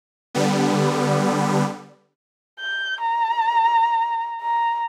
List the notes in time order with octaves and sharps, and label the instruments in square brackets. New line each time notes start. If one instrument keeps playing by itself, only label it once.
[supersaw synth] D3 G3 B3
[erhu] G6
A#5
A#5